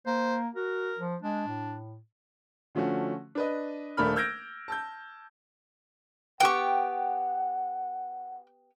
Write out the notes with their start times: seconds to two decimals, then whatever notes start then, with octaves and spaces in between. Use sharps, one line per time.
0.06 A#3 C5
0.55 F#4 A#4
0.98 F3
1.22 G#3 D4
1.48 A2
2.75 D3 F3 A3 C#4 F#4
3.35 D4 B4 D#5
3.97 D#1 A3 D4 A#4 B5 F6
4.16 E6 F6 G6 G#6 A#6 D7
4.68 A5 E6 G6
6.40 B3 G4 F#5 G5 C#6